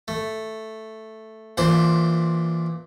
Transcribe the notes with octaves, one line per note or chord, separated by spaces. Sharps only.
A3
A#2 E3 D4 C5